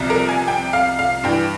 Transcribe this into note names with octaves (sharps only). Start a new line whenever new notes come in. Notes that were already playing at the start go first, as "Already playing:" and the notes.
Already playing: C2 C3 F3
A#4
G#5
G5
F5
F5
G2 E3 G5